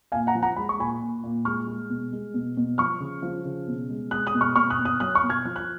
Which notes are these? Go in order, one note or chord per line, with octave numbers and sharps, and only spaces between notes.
A#2 F5 G#5
F#5 A#5
F3
F#5 A#5
G#3 B5
C#6
A#2 G#5 B5
A#2
A#2
G#3 C#6 F6
G#3
B2
G#3
B2
B2
F3 C#6 F6
C#3
F3
C#3
B2
G#3
G#3 D#6 F#6
D#6 F#6
B2
C#6 F6
B2 C#6 F6
D#6 F#6
B2
D#6 F#6
F#3 D#6 F#6
C#6 F6
B2
F6 G#6
F3 F6
F#6